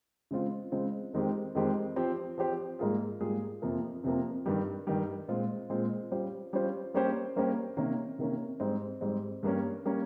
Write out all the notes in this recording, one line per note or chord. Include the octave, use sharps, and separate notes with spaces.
C#3 G#3 C4 F4
C#3 G#3 C4 F4
F2 D#3 G#3 C4 G4
F2 D#3 G#3 C4 G4
F3 C4 G4 C5
F3 C4 G4 C5
G#2 G3 A#3 F4 G#4
G#2 G3 A#3 F4 G#4
F2 C3 F3 A#3
F2 C3 F3 A#3
G2 D#3 G3
G2 D#3 G3
A#2 G#3 C4 F4
A#2 G#3 C4 F4
G3 C#4 F4 C5
G3 C#4 F4 C5
G3 A#3 C#4 G4 C5
G3 A#3 C#4 G4 C5
C3 D#3 A#3 C#4
C3 D#3 A#3 C#4
G#2 G3 C4
G#2 G3 C4
G2 G3 A#3 C#4
G3 A#3 C#4